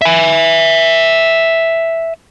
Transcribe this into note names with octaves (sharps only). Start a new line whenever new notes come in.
E5 G#5